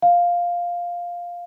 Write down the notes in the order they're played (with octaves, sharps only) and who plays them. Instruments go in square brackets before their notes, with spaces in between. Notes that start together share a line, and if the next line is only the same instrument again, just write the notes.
[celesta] F5